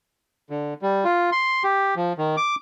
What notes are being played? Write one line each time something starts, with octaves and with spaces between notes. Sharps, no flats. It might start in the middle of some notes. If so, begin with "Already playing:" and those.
D3
G3
F4
C6
G4
F3
D#3
D6